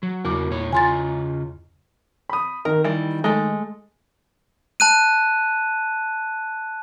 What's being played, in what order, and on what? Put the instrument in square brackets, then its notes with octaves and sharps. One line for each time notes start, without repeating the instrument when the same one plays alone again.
[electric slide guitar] F#3
[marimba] E2 D6 [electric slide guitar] C#3 F#4 A#4
[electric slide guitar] A#2 C#5
[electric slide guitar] C#3 F4 A#5 [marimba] G#5 C6 A6
[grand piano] B5 D#6
[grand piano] D#3 [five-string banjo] A#4
[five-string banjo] E3 G3
G#3 A3
[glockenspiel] A5 F#6 D#7